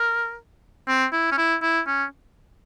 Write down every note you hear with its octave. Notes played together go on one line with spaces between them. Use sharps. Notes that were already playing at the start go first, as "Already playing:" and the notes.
Already playing: A#4
C4
E4
C#4
E4
E4
C#4